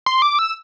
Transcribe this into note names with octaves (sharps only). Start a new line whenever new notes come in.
C6
D6
E6